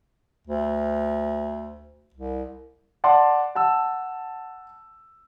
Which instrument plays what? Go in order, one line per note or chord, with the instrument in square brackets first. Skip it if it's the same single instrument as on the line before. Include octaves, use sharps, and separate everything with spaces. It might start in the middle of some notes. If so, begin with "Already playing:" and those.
[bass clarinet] D2
C2
[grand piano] D5 F#5 A5 C6
F#5 A5 E6